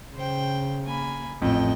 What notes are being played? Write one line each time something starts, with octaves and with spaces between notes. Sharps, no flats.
C#3 C5 G5
A#3 G#5 B5
A1 F2 A3 D#5 G5